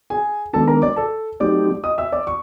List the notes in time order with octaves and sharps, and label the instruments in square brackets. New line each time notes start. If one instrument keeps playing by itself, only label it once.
[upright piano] G#4 G#5
[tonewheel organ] D#3 G#3 B3 D4 [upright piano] A4 A5
[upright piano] A#4 A#5
D5 D6
A4 A5
[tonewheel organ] F#3 A3 C4 D#4 G4 [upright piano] D5 D6
[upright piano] D#5 D#6
E5 E6
D5 D6
C#6